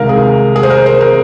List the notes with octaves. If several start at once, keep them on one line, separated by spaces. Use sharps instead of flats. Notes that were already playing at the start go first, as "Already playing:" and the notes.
Already playing: C2 C3 D#3 G#3 A#4 F5
G#4
G#4
C5
A#4
C5
A#4